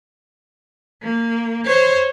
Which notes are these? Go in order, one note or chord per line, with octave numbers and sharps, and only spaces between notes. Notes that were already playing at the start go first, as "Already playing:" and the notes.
A#3
C5 C#5